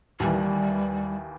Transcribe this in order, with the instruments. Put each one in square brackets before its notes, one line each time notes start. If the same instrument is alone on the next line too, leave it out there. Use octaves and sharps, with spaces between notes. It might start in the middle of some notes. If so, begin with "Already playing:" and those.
[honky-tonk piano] D#2 E3 [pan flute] G3